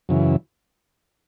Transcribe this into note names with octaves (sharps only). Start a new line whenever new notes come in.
F#2 C#3 E3